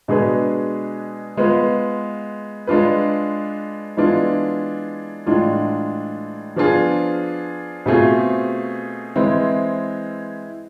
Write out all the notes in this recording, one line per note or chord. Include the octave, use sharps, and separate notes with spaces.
B2 G#3 D4 G#4 B4
G#3 B3 F4 B4
G#3 D4 F4 B4
E3 G#3 B3 D4 F4
A2 E3 G#3 D4 F4
F3 B3 D4 F4 G#4
B2 A3 C4 F4 G#4
E3 G#3 C4 E4 B4